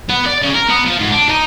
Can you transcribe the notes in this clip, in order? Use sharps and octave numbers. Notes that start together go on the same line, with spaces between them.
B3
D5
C#3
A#4
B3
F3
G#2
D4
D#4